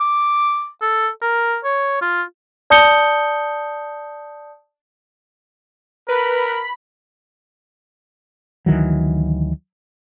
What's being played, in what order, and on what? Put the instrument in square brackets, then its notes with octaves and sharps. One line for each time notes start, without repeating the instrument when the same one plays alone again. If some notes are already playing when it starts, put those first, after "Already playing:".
[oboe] D6
A4
A#4
C#5
F4
[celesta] D5 A5 D#6 G6 C#7 G7
[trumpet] A#4 [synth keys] B4 [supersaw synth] B5
[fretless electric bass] D2 D#3 E3 F#3